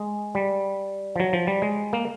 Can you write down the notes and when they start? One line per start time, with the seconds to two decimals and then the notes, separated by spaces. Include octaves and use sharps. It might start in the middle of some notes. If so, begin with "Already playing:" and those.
Already playing: G#3
0.35 G3
1.16 F3
1.20 F#3
1.33 F3
1.47 G3
1.62 G#3
1.93 A#3